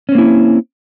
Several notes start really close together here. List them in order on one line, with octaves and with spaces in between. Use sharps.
C#4 C4 A#3 E4